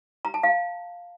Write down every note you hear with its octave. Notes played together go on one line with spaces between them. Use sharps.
A#5
A5
F5